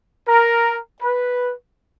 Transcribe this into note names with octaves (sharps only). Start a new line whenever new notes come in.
A#4
B4